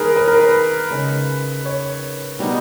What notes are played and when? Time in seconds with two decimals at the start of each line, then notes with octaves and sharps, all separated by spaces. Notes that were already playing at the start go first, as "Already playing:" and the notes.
Already playing: D#3 G3 A#3 G#4 A#4 B4
0.16 B4
0.28 A#4
0.40 B4
0.90 C#3 G#3 D#4
1.65 C#5
2.39 B2 G3 B3 D#4